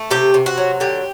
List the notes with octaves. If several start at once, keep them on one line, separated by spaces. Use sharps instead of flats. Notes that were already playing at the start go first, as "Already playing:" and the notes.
Already playing: A3
C3 G4
C3
F#4
F#3
D3 G4